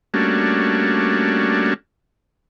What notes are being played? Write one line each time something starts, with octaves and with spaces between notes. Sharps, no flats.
G3 A3 A#3 C#4 D4 F#4